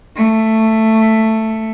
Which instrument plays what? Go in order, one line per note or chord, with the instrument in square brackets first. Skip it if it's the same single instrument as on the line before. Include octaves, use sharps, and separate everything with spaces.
[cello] A3